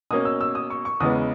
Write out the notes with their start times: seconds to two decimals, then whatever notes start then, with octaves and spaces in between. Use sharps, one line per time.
0.11 B2 A#3 C#4 D#6
0.25 E6
0.41 E6
0.55 D#6
0.70 C#6
0.85 C#6
1.00 E2 C#3 G#3 B3 D#6